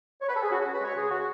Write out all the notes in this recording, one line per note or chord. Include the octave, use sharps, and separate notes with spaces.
C#5
B4
A4
G#4
C#3 F#4
C#4 F#4
B4
G#3 C#5
C#3 G#4
C#3 F#4